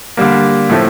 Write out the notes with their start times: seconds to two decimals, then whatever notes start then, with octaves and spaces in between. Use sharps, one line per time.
0.17 D3 G3 A#3
0.70 A2 F3 A3 C4